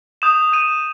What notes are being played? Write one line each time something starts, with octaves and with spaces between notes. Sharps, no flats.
D#6 G6 E7
D#6 G6 D#7